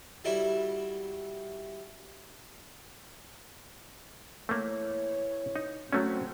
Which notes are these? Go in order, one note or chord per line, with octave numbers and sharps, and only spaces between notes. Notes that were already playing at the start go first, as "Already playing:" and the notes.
F#3 G3 E4 A4 E5
E3 A3 A#3 E4 C#5
D#4
F#3 A3 C4 C#4 F#4